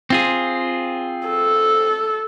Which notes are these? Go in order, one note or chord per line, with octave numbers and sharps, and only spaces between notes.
C4 F4 G#4
A4